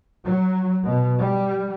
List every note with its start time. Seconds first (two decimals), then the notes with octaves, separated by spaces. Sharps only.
0.24 F#3
0.83 B2
1.20 G3